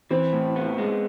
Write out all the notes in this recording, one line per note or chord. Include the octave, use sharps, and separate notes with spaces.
E3 C4
A2
B3
G#3